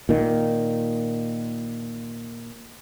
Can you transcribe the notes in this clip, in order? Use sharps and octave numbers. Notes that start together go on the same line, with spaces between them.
A#2 D#3